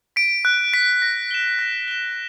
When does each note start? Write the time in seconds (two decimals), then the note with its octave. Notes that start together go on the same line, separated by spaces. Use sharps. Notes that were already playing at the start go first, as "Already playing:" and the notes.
0.16 B6 D7
0.45 F#6
0.74 B6 D7
1.02 A#6
1.31 E7 G7
1.59 A#6
1.88 E7 G7